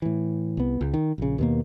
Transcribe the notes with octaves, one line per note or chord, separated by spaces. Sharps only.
A2 E3
C2 B3
C#2
D#3
A#1 C#3
D#2 B2 A#3